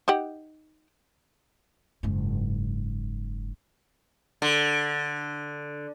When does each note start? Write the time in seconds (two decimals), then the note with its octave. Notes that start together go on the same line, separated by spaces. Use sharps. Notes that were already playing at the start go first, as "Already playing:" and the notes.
0.08 D#4 G4 F#5
2.03 F#1 G#2
4.42 D3